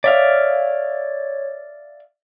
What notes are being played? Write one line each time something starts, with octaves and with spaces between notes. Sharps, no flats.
C#5 D5 E5 F5